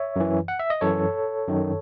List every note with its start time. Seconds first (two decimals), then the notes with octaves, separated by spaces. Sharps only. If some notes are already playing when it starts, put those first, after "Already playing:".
Already playing: C#5 E5
0.16 F#2 E3
0.48 F#5
0.59 E5
0.70 D#5
0.81 F#2 E3 A4 C#5
1.48 F#2 D#3